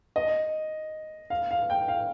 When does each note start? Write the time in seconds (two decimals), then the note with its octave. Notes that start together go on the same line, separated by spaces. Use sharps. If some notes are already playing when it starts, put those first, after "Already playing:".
0.16 D#5
1.30 F5
1.51 F5
1.70 G5
1.88 F5